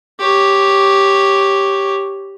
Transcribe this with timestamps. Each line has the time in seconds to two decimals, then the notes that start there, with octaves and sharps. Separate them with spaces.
0.20 G4 C#5